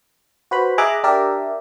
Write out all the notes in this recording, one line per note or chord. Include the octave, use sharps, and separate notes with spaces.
F#4 B4 C5 B5
G#4 D#5 E5 A#5 D6 F#6
D4 G4 A#4 D5 E5